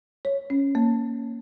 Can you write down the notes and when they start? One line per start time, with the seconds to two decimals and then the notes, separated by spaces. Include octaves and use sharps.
0.25 C#5
0.50 C#4
0.75 A#3